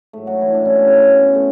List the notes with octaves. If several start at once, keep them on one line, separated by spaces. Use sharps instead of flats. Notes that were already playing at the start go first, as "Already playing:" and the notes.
G#2 F#3 A3
F#3 F#4
E3 E4
A2 F#3 D4
C#4
B3
C#3 C#4
B2 F#3
F#3 A3 A4